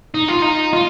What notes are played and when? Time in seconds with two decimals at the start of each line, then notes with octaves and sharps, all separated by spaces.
0.15 D#4
0.28 F4
0.42 D#4
0.73 F4